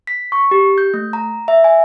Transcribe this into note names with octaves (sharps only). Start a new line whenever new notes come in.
B6
C#6
G4
G6
A3
A#5
E5
G#5